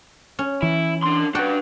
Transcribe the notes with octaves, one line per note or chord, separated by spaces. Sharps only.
C#4
E3 E4
D4 C6
D4 F#4 B4 G5